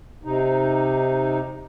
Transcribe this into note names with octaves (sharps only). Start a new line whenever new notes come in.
C3 D#4